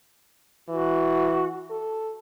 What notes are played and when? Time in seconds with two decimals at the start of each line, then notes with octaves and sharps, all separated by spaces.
0.69 E3 F#4
1.71 A4